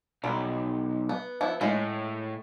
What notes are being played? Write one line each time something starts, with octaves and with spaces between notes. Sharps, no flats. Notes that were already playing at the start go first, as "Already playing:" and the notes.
B1 G3
B3
F3 B3 E4
A2 G#3 C#4 G#4